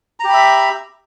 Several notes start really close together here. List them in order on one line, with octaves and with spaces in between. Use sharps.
A#5 G4 B5 E5